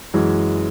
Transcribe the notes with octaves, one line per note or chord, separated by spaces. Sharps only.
F#2 E3 G#3